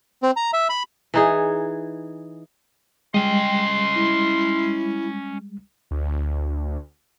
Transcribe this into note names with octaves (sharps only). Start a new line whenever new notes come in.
C4
A#5
E5
B5
E3 D#4 G#4
G3 G#3 C#4 D#5 G5 C6
E4
D2